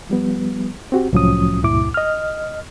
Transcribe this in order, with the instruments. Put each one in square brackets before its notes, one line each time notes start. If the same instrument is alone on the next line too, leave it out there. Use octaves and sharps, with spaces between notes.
[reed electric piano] F3 G3 B3
C4 F#4 G4
C2 A2 F3 F#3 C#4 D#6
C#2 G2 A#2 E4 D6
D#5 F6